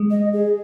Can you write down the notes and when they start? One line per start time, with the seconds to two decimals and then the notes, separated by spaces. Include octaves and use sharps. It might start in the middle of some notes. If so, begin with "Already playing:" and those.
Already playing: G#3
0.11 D#5
0.33 G#4